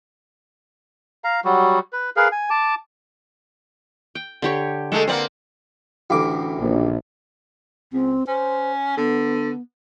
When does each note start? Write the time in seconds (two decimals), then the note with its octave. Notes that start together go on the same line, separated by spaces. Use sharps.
1.24 F5 A#5
1.45 F#3 G3 F#4
1.93 B4
2.16 G#4 A#4 B4 F5
2.32 G#5
2.50 A5 D6
4.15 G5
4.42 D3 G4 C#5
4.92 G#3 A3 A4
5.07 A#3 C4 B4 D5 F#5
6.10 A1 D2 D6
6.59 A#1
7.93 C#2 C4
8.27 C#4 C5
8.97 D3 B3